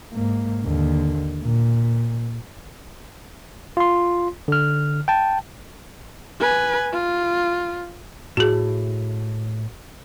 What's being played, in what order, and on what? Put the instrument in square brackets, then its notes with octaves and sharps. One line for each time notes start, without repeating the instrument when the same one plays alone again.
[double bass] G#2 A#3
D#2 D3
A#2
[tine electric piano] F4 C6
D3 F6
G5 A5
[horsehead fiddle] B4 G#5
F4
[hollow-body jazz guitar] A2 [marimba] F#4 G#4